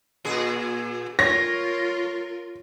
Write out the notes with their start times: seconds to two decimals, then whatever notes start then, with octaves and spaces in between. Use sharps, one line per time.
0.25 A#2 G#4
1.19 F4 A#4 C#5 A#6